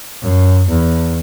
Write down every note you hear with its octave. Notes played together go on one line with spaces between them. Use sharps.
F#2
E2